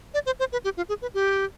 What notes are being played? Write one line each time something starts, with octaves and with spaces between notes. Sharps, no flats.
D5
C5
C5
B4
G4
F4
G#4
B4
G4